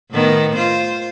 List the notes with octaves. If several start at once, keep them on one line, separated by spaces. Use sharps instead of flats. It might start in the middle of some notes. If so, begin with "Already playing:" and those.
A2 D#3 B3
F4 C5